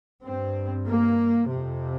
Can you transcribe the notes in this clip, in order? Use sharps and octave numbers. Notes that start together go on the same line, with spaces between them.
G2 C4
A#3
F2 C3